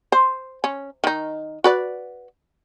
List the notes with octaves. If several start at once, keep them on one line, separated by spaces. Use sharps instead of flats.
C5
C#4
D#3 D#4
F#4 B4 D5